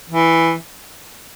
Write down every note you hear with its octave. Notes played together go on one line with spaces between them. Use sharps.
E3